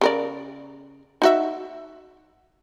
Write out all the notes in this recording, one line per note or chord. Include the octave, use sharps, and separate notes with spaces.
C#3 A#4 D5
D#4 F#4 E5